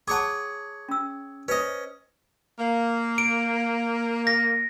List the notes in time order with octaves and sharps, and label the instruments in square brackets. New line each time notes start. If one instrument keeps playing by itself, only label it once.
[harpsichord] G#4 C#5 F#5 [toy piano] A5 D6
[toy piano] C#4 E6
[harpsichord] C#4 D#5 [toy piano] B4 C5
[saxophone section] A#3
[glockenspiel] D7
A#6